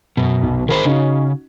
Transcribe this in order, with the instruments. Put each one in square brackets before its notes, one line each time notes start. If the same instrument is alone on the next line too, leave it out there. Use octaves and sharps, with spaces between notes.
[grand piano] F#2 [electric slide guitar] B2
[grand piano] B1
[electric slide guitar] D#3 G#4 C5 [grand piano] A#4 B5
[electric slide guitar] C#3 [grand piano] C#4 D#4 F#4